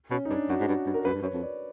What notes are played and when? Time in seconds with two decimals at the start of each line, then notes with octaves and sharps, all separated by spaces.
0.11 B2 C#4
0.25 D#4
0.30 G2 D4
0.49 F#2 F#4
0.60 G#2
0.68 G2
0.86 G2
0.94 A#4
1.05 F#2 B4
1.13 G2
1.22 F#2 C#5
1.33 F2
1.43 D5